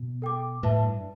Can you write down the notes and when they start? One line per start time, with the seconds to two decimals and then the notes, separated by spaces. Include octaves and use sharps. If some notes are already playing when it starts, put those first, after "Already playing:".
Already playing: B2
0.22 A4 G5 D6
0.63 A2 B4 E5 A5
0.83 G2